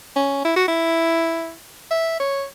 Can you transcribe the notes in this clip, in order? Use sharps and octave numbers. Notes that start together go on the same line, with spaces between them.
C#4
E4
F#4
E4
E5
C#5